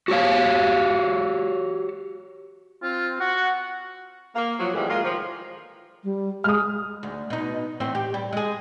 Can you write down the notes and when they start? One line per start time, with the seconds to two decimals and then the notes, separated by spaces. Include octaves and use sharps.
0.08 F#4 G4 C#5 F5
2.83 C4 F4
3.20 F#4 F#5
4.35 A#3
4.58 F3 F#3
4.73 A2 C3 E3 G3 G#3
4.88 G#3 A#3 F4
5.03 D#3 F3
6.04 G3
6.44 G#3 D#6 F6
7.03 D2
7.30 B2 D#4
7.80 E2 A2 C4
7.95 G4
8.14 G3
8.33 G#3 G#4